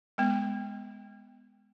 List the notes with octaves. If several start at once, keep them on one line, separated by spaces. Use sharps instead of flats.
G#3 B3